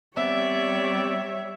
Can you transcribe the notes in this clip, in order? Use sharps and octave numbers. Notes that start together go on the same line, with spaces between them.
G3 B3 C4 C#5 D5 E5